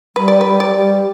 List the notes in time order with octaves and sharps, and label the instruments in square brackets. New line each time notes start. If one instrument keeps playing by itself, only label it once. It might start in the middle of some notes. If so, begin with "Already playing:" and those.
[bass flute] G3 [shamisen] B4
[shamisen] D5
[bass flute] G3 [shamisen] B4
[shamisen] D5
[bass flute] G3